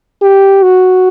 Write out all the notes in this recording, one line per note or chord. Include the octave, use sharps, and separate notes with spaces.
G4
F#4